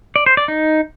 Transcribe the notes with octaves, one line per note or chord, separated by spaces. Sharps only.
D5
C5
D5
D#4